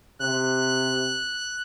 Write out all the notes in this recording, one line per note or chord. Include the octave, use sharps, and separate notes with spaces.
C3 F#6